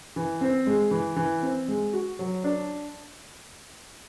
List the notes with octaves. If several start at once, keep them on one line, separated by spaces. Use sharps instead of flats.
E3
C4
G#3
E3
E3
C4
G#3
F#4
F#3
D4